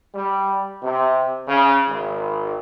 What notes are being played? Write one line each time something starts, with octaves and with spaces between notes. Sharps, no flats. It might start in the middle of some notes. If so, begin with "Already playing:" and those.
G3
C3
C#3
G#1